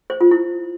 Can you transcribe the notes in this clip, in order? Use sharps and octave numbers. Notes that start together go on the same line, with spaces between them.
C5
F4
E4